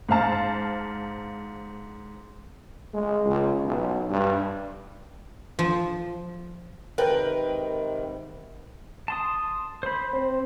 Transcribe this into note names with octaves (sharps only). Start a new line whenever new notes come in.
G#2 C5 F5 A5
G#3
C#2
B1
G2
F3
G#2 C3 D#3 A#4 B4 G5
A5 C6 D#6
C5 B5
C4 C5